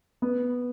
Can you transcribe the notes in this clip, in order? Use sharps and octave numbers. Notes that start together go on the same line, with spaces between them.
B3